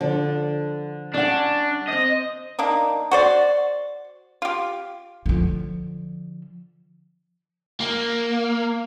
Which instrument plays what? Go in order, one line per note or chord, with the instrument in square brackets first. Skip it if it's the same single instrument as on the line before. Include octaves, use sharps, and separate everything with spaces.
[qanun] D3 [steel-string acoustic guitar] F3 D4
[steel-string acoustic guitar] G3 F#5 [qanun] C#4 E5 [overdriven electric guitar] D4
[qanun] C4 C5 [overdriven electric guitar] D#5
[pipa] A#3 D4 D#4
F#4 C5 D5
F4 G4
[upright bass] D3 F3
[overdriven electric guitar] A#3